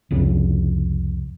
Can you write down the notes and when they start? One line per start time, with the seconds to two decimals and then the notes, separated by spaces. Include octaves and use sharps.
0.11 C2 F2 C#3